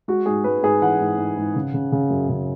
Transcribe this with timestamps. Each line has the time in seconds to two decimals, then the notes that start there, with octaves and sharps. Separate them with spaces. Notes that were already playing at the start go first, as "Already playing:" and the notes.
0.08 G#3 F#4
0.26 G#2 G#4
0.44 G#3 B4
0.63 G#2 G#4
0.82 E3 F#5
0.99 G#2
1.18 G#2
1.37 G#2
1.55 C#3
1.74 C#3
1.92 C#3
2.10 F#2
2.29 C#3